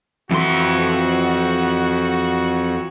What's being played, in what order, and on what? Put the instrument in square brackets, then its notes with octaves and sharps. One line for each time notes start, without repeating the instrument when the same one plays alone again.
[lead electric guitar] F2 C6 [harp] E3 [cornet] F#4